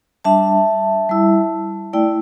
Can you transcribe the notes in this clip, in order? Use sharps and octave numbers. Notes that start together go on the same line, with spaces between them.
G3 D4 E5 A5
G3 E4
A3 E4 D5 G5